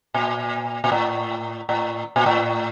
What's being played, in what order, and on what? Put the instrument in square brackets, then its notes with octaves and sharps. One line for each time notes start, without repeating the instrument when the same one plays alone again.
[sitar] A#2
A#2
A2
A2
A#2
A2